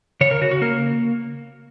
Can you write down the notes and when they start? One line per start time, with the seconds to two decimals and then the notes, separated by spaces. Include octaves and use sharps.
0.21 C#3 C#5
0.31 A#4
0.41 C#3 F#4
0.51 F#4
0.62 A#3 A#4